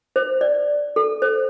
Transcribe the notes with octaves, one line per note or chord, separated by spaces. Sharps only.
C5
D5
A4
C5